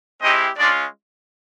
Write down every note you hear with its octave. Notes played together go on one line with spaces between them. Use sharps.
G#3 C4 D#4 E4 G4 D#5
G#3 C#4 D4 F4 D5